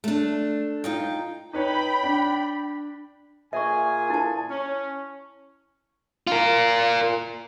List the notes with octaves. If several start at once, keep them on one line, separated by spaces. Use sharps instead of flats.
A3 D4
D#4 F4 G5
D#4 B4 C#5 G5 B5
D4
A#2 G#4 E5 G#5 C#6
E4 A5
C#4
F4 A#4